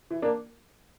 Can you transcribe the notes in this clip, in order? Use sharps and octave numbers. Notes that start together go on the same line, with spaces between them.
E3
A#3 D4